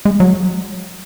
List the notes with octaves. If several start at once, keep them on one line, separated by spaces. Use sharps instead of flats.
G#3
F#3